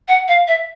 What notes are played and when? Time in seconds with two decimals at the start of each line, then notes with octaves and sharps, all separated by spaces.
0.08 F#5
0.28 F5
0.48 E5